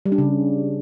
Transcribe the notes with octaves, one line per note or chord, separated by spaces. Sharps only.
G3
D4
C#3